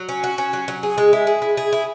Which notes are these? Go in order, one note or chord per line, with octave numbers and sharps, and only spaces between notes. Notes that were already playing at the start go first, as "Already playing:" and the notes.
Already playing: F#3
C#4
F#4
C#4
F#3
F#3
G#4
G#3
E4
G#4
E4
G#4
E4